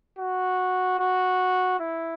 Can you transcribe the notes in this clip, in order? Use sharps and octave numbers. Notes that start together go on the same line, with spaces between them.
F#4
F#4
E4